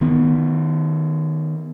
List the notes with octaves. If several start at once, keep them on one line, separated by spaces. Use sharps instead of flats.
D#3 B3